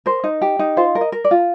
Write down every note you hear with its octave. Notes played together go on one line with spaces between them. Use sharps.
A#4 C5
D#4
G4
D#4
F4 C5
A#4
D#5
A#4
D5
F4